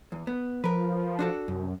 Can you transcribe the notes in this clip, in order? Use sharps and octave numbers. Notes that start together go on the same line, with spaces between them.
E2
B3
F3 A#4 B4
D4 F#4 A4
C2 F#2